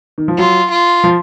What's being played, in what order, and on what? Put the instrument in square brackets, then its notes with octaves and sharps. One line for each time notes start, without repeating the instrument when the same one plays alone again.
[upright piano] D#3
F3
[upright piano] F#3 [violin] F4
[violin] F4
[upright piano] F3